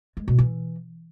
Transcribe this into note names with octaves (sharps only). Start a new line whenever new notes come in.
G#3
B2
E3